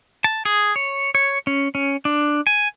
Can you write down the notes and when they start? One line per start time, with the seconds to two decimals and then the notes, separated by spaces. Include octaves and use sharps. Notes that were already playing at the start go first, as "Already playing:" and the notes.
0.24 A5
0.45 G#4
0.76 C#5
1.15 C#5
1.47 C#4
1.75 C#4
2.05 D4
2.47 G#5